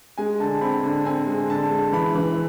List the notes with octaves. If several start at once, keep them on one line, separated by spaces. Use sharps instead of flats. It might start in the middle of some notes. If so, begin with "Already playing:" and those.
G#3 G#5
D3 A5
C4 B5
D3
C4 G#5
G#3
D3 A5
G#3
E3 B5
E3